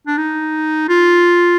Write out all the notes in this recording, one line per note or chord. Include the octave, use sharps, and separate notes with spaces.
D4
D#4
F4